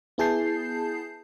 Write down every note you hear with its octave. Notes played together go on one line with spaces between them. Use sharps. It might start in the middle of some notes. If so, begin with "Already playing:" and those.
B3 E4 G#4 A5 G6 C7